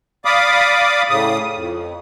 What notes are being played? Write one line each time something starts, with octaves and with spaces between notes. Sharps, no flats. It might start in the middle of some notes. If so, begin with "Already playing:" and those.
D5 F5 B5 D6 D#6
A2 C#3 D#6
F2